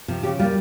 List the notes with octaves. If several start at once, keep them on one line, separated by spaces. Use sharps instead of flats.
C3 F3
C#3 G4
G3 A#3 F4